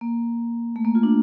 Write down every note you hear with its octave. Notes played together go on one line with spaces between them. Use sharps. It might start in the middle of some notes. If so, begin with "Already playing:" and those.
A#3
A3
A#3
F4
D4